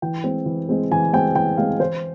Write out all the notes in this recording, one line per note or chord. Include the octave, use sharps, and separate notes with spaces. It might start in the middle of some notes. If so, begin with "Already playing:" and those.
E3 G5
G#3 C4
E3
G#3 C4
E3 G#5
G#3 C4 G5
E3 G5
G#3 C4 F5
E3 C5